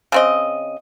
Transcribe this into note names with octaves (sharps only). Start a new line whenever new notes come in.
C#3 C4 D#5